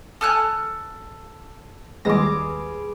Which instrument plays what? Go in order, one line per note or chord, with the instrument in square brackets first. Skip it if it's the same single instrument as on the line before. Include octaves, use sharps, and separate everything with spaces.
[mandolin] A4 F6 F#6 [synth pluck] G#5 A5 D#6
[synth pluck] D#2 G#3 A#6 [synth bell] G3 B4 B5 [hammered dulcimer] G#4 D6